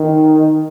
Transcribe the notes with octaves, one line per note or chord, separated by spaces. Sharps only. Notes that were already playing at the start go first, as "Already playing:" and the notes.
Already playing: D#3